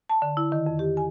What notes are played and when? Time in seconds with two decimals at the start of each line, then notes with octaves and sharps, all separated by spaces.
0.09 A5
0.22 D3
0.37 E4
0.52 D#3
0.66 F2
0.79 G4
0.97 G#5